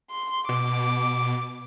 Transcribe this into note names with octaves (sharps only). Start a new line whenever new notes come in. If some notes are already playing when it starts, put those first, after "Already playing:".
C6
B2 D6